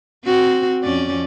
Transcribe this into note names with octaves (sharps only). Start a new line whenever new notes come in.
C4 F#4
F2 C#4 D5